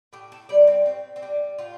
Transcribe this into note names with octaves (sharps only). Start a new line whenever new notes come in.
A2 G4
A4
G3 D5
C4
A2 C4
C4
G3 D4
A2 F4